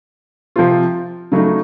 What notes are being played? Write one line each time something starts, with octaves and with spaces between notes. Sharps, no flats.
C3 F3 C4 F4
C#3 F#3 A3 D#4